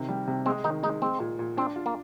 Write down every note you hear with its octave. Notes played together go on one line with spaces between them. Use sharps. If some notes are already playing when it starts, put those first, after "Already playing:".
Already playing: C3 D#3
G3
C3
G#3 C4
D#3 D#4
G#3 D#4
G#3 C4
A#2
A#2
C4 D4
F4
A#3